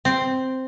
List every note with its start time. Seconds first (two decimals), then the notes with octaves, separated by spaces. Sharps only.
0.05 C4